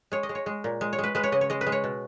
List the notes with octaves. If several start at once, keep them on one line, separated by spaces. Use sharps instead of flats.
G#3 C#5
D#5
G#3
C#5
G#3
A#2
G#3
C#5
G#3
B4
G#3 B4
C#5
C#3 D#5
C#5
G#3 D#5
B4
G#3
C#5
B2